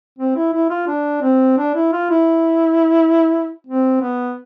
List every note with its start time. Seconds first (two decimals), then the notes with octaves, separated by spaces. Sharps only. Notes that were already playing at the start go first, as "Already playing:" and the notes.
0.18 C4
0.36 E4
0.53 E4
0.70 F4
0.87 D4
1.22 C4
1.57 D4
1.75 E4
1.93 F4
2.10 E4
3.67 C4
4.01 B3